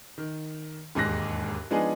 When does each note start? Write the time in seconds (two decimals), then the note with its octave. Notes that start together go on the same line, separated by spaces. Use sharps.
0.18 D#3
0.95 E1 D#2 G#2 F#6 A#6
1.70 F3 G#3 B3 D4 D#4 G#4